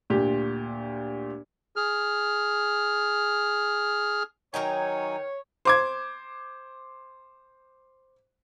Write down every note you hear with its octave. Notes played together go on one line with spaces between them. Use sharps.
D2 A#2 G4
G#4 F6
D#3 F#3 D#4 C#5 D#5 G5 G#5
C5 D6 G#6